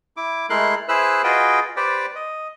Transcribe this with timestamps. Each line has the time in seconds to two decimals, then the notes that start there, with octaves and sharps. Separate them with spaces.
0.17 E4 D6
0.50 G#3 A3 E4 A#4 C6 F#6
0.88 E4 G#4 B4 C5 E6 F#6
1.24 F4 F#4 G#4 B4 D#5 G5
1.76 G4 B4 C5 D5 G5
2.15 D#5